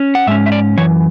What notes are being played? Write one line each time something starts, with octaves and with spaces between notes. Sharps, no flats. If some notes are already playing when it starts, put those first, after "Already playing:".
Already playing: C#4
F#5
G#2 G#3 C#4 E5
E5
D5
F#2 E3 C#5